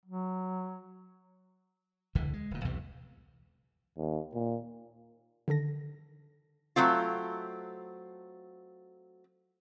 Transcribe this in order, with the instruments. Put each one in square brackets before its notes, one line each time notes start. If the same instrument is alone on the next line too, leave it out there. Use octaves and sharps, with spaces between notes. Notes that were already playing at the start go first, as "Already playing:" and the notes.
[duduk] F#3
[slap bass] E1 C#2 D3 E3
G#3
D1 A#2
B1 E2 C3 E3
[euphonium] D#2
A#2
[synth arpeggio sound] D3 D#3 A4 A#6
[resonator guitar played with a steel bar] F#3 A3 C4 F4